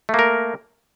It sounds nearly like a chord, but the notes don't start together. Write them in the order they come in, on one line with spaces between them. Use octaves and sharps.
A3 A#3 A#4